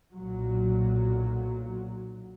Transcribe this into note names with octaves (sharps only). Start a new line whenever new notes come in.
B1 A#2 F#3